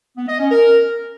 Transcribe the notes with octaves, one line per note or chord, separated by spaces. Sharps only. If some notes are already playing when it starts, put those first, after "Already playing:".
B3
D#5
C#4
A#4